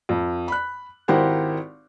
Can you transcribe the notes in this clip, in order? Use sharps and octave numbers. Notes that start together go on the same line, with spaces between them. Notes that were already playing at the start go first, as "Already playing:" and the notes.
F2
B5 F#6
G#1 E4 G4 A#4 C5 F#5